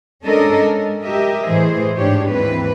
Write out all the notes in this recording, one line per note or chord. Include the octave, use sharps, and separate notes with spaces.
G#3 C#4 D4 A4 A#4 D#5
G#3
G4 A#4 D#5 E5
A2 E3 G#4 C5
G#2 D4 G4 C#5
D#2 G#2 E3 C4 B4